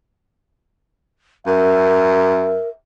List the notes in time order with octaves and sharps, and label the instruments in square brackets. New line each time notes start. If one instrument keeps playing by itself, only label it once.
[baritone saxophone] F#2 [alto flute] A#4 [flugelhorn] E5